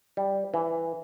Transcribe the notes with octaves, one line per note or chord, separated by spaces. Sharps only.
G3
E3